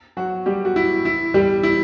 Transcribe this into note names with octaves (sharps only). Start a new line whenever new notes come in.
F#3 F#4
G3 G4
F#4
E4
E4
G3 G4
E4